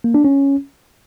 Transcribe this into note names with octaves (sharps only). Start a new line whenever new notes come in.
A#3
D4
C#4